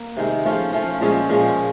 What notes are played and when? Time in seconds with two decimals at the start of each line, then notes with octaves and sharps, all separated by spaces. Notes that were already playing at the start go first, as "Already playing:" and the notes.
Already playing: A#3
0.17 C3 D#3 G#3
0.45 F3 A3 C#4 F4
0.73 F3 A3 C#4 F4
1.01 A#2 F3 G#3 C#4
1.29 A#2 F3 G#3 C#4